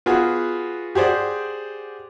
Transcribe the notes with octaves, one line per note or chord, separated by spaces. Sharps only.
B3 F4 F#4 G#4
G4 G#4 C5 D5 F#5